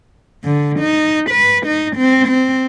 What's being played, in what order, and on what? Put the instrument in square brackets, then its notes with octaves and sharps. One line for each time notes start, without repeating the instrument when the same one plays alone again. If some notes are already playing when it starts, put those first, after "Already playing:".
[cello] D3
D#4
B4
D#4
C4
C4